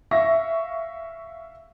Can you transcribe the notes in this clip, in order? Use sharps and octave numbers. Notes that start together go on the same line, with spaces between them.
E5 F5 C#6 A#6